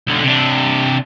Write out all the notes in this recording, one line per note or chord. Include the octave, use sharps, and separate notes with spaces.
B1 D3
C3 D4